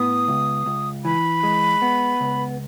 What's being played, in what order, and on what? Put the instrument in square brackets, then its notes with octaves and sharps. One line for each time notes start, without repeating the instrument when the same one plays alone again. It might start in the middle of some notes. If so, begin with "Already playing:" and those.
Already playing: [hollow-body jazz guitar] A2 B3 [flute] D#6
[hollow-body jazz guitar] C#2
C#2
[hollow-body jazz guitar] E3 [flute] B5
[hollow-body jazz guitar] G#3
B3
C#2